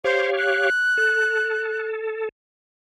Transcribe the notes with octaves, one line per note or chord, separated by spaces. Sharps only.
G4 C5 C#5 F5
F#6
A4